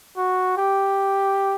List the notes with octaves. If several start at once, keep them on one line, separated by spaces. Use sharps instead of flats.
F#4
G4